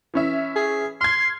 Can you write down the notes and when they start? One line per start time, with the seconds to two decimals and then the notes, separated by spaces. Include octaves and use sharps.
0.14 E3 C#4 E5
0.56 G#4
1.01 C6 F6 G#6 C7